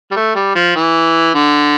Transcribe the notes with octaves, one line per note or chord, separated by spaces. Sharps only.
G3
A3
G3
F3
E3
D3